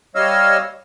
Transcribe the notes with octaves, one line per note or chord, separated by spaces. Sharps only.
G3 C#5 D#5 F5 E6 F6